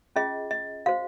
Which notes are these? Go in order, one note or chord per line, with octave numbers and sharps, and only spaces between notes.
C#4 F4 G#4 D#5
D#5
F#4 C5 F5